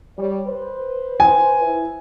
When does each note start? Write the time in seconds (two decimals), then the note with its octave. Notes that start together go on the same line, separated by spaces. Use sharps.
0.17 G3 C#5
0.47 B4 C5
1.20 G#5
1.61 E4